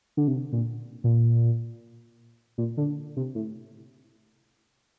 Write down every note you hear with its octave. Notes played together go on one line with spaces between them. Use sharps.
D3
C3
A#2
A#2
A#2
D3
C3
A2